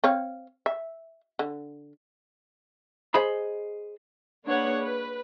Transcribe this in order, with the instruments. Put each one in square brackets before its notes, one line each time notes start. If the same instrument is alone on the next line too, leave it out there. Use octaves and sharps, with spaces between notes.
[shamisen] C4 C#5 F5
E5
D3
[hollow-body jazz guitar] G#4 C5 D#5 B5
[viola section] A#3 D4 G#4 B4 C#5 F#5
B4